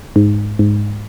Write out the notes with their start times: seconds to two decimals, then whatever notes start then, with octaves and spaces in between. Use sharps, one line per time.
0.16 G#2
0.59 G#2